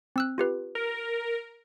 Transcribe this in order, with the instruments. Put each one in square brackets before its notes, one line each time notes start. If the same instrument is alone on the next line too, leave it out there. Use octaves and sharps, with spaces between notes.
[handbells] C4 E6 F#6
F4 G4 B4
[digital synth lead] A#4